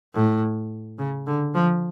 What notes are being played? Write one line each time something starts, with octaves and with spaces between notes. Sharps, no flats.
A2
C#3
D3
F3